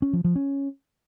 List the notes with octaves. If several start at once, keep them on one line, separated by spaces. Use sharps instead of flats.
C#4
F3
F3
C#4